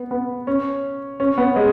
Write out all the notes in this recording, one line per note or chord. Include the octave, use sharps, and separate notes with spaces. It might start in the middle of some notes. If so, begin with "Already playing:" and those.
Already playing: B3
B3
C#4
C#4
B3
G#3